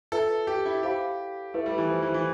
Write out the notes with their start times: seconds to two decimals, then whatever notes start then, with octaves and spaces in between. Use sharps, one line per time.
0.12 F4 A4 B4 E5
0.47 G4
0.66 E4
0.83 G4 C5 F5 B5 D6
1.54 A3 E4 B4 E5
1.66 G3
1.78 E3
1.90 F3
2.03 E3
2.14 E3